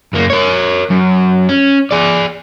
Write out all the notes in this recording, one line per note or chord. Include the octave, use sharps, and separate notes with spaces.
F#2 A#3
A#4 C#5
F#2
C#4
G#4 D5